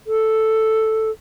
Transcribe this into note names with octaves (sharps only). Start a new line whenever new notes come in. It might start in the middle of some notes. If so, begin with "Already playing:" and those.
A4